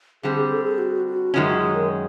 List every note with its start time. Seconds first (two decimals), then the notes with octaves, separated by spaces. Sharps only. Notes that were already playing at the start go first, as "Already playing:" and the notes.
0.23 D3 G3 C4 G#4
0.36 G#4
0.51 A4
0.64 G#4
0.78 F#4
1.06 F#4
1.34 F#2 D#3 G#3 C#4 F4
1.47 F#4
1.61 F#4
1.75 A#4